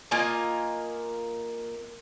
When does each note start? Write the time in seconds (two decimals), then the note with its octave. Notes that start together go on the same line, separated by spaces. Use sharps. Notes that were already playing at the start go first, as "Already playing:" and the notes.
0.11 A#3 F4 D#5 G#5